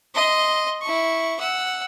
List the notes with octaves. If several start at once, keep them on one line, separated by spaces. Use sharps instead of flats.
D#5 C6
E4 C#6
F#5 E6